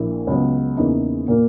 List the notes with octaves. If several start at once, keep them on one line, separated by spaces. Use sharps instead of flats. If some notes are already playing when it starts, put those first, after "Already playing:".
Already playing: A#1 A#2 A#3 E4
C#2 C#3 F#3 B3
E2 C#3 E3 A#3 D#4
A#2 A#3